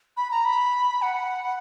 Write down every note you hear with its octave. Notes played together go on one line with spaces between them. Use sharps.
B5
A#5
B5
F#5